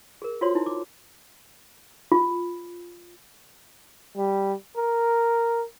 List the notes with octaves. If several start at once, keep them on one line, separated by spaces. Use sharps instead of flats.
G#4 A#4
F4 F#4 C5 C#5 C6
D#4 E4
D6
F4
G3
A#4